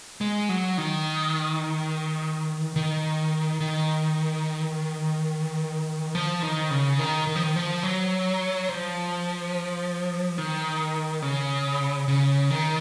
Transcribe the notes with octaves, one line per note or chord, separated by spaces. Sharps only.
G#3
F#3
D#3
D#3
D#3
F3
D#3
C#3
D#3
D#3
F3
D#3
F3
F#3
F3
D#3
C#3
C#3
D#3